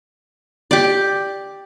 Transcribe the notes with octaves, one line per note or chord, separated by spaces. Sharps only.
G4 D5